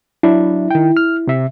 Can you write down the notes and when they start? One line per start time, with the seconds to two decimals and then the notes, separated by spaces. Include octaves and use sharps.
0.23 F#3 D4 E4
0.71 D#3 G5
0.97 F6
1.27 C3 E5